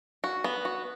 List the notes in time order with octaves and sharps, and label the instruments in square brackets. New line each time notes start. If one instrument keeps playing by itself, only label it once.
[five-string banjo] F#4
B3
F#4